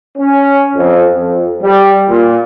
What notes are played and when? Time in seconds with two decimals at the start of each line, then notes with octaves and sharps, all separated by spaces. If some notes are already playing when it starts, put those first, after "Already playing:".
0.18 C#4
0.74 F2
1.13 F2
1.61 G3
2.07 A#2